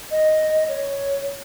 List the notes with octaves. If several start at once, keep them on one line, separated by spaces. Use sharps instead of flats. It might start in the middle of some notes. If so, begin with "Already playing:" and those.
D#5
C#5